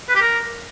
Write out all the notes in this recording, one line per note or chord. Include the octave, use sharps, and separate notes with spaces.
B4
G4
A#4